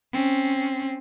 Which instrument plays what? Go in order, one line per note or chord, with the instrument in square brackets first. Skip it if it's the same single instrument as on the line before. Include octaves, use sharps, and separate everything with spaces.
[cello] C4 C#4